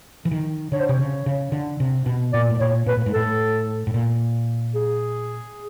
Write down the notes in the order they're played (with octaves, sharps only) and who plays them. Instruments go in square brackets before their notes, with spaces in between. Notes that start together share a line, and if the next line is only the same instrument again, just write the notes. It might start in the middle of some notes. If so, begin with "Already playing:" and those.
[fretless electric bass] E3
D#3
[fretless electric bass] D3 [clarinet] C#5
[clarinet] C5
[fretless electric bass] C3 [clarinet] C#5
[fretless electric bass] C#3
C#3
D3
C3
B2
[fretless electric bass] A#2 [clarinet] D5
[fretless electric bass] A2
[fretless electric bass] A#2 [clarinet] C#5
[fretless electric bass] A#2 [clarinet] B4
[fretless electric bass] A2
G#2
[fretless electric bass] A2 [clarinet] A4
[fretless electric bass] A2
A#2
[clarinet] G#4